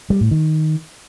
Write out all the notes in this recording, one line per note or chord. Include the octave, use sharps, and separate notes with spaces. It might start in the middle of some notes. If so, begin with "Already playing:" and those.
G3
A2
D#3